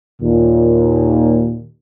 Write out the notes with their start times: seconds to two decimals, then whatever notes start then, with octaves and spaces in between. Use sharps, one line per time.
0.22 D#2 A#2